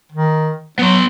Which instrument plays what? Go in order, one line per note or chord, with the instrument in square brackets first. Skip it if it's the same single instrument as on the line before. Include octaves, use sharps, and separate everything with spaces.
[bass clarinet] D#3
[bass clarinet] F#3 [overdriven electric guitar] B3 C6